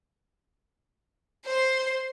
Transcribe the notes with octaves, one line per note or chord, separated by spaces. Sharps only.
C5 C6